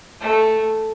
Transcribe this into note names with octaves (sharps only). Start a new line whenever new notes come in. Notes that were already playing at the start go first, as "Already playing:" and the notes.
A3